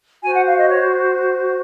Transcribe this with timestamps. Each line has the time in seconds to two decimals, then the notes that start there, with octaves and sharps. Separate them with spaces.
0.23 F#4 C5 G#5
0.35 F#5
0.46 F5
0.58 D#5
0.69 C#5